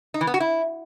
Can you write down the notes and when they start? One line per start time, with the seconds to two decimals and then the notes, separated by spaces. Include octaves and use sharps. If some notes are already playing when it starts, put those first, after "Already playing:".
0.14 D#4
0.21 E3
0.27 B3
0.34 F#4
0.40 E4